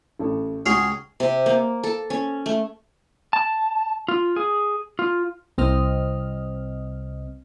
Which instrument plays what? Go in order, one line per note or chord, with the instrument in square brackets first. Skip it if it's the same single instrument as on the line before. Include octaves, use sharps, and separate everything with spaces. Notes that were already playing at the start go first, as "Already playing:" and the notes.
[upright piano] A1 A4
[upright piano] C#2 F#4 F7 [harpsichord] C#4 G#4 C6
[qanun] C3
A#3
A4
C#4
A3
[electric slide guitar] A5
F4
G#4
F4
[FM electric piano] C2 C4 D#5 F6